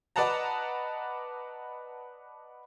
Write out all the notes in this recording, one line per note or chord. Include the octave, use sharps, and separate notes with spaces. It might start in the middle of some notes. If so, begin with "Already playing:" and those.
B4 D5 D#5 F#5 A5 A#5